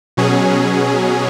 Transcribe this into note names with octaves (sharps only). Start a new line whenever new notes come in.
B2 F#3 C#4 G#4